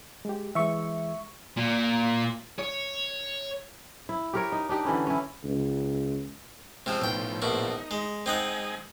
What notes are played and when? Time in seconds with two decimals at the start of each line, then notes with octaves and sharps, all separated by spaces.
0.25 G#3 G4
0.55 E3 G#3 E5 C#6
1.57 A#2
2.59 C#5
4.09 E4
4.33 G4 A#4 C#5
4.52 D#4
4.69 D4 D#4 G4
4.85 D3 E3 C#4 E4
5.07 C#4 E4
5.43 C#2
6.86 C3 F3 G#3 E6
7.02 B1 A2 F3 G5
7.42 A#1 B2 E4
7.71 D#4
7.91 G#3
8.26 G#3 C4 D#4 D#5 F#5 G#5